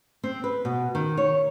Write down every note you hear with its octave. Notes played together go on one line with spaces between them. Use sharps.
C4
B4
B2
D#3
C#5